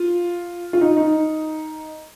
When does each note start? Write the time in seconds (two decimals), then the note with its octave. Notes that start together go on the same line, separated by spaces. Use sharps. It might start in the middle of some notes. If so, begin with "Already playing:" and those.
Already playing: F4
0.73 F4
0.81 D#4
0.97 D#4